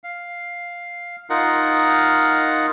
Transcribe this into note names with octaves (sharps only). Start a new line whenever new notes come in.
F5
D#4 F4 A#4 F#5